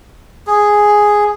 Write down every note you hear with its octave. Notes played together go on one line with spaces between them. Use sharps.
G#4